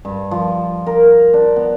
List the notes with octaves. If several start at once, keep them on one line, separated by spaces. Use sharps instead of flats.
G2
F3
A#4
D4
B3